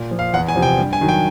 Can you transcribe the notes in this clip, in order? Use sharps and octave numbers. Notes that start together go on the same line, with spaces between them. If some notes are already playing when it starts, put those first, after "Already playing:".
Already playing: A#2
F3
F5
E2 F#5
G#5
C3 F3
G5
G2
G#5
D#3 F#3
G5